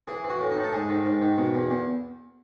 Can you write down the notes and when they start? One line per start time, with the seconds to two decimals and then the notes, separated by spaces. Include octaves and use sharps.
0.08 E3 G#4
0.24 E3
0.30 F#4
0.40 A2
0.51 D#4
0.57 A2
0.64 A4
0.73 G#2 G#4
0.89 D#3
1.05 G#2
1.22 D#3
1.38 B2
1.54 E2
1.70 E2